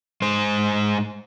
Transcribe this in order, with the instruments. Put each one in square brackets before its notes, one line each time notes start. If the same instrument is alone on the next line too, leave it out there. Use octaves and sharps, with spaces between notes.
[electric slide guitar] G#2 G#3 C5